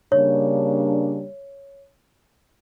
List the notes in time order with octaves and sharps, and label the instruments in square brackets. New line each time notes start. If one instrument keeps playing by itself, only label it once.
[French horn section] C#3 G3 A#3 D4 [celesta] C#5